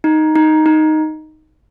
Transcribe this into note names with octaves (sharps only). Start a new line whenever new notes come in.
D#4
D#4
D#4